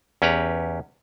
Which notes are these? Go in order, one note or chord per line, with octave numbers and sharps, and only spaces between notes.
E2 C#4 G4 B4 A#5